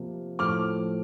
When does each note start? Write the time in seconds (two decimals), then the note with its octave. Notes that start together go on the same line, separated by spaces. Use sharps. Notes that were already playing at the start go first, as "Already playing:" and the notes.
Already playing: C3 F3 A#3
0.39 A2 F3 A3 D6 F6